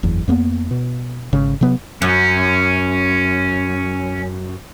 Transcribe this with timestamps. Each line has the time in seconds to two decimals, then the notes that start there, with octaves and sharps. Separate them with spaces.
0.03 F#1 E2
0.28 F2 A#3 B3
0.71 B2
1.33 G#1 C#3
1.61 C3 F#3 B3
2.02 F#2 C#4